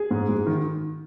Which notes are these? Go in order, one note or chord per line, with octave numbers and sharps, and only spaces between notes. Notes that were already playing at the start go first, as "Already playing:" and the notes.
Already playing: G#4
G#2
G#2
D#3